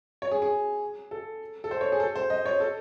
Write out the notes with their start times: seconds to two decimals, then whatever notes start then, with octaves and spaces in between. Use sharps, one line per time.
0.22 C#5
0.31 G#4
0.42 G#4
1.11 A4
1.64 A4
1.71 C5
1.81 C#5
1.92 G#4
2.00 A4
2.16 C5
2.30 D#5
2.46 C#5
2.60 A4